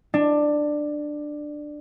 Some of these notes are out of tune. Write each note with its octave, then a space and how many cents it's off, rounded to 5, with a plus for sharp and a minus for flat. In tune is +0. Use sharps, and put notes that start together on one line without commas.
D4 +15